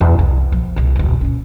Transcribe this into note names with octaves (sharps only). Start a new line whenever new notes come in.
E2 B3
C2
A#1 F3
C2 A#2
E1 C#2
A#2 C#4